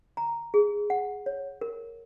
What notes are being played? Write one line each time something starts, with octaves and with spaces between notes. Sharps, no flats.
A#5
G#4
F#5
C#5
A#4